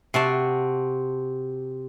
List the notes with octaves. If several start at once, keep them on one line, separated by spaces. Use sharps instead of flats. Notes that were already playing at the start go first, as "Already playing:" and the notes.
C3 F#4 A5